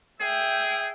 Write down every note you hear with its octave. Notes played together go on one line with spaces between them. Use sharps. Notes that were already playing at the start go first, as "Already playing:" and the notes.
G#4 E5 G5